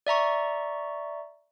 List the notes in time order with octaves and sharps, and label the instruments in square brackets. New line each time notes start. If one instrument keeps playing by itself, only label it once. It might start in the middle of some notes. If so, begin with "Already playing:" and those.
[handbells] D5 E5 A#5 C#6